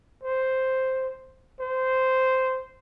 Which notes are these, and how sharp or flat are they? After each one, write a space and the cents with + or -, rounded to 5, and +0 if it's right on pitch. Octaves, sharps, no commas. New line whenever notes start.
C5 +0
C5 -10